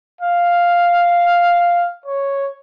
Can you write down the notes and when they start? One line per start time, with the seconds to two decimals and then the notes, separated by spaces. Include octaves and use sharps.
0.21 F5
2.06 C#5